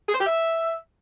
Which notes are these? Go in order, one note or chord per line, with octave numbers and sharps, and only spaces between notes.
G#4
C5
G4
E5